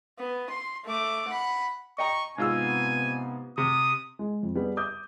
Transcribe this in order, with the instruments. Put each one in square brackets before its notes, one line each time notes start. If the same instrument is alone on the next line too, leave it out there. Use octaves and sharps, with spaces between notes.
[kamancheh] B3
C6
A3 D6
F#5 B5
[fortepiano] D#5 G5 A#5 [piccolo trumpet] C#6
[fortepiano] G#2 F4 E6 [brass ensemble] C3 B3 [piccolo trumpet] G#5
[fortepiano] C3 [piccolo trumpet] D#6
[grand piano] G#3
F2
G3 B3 G4 G#4
D6 D#6 G6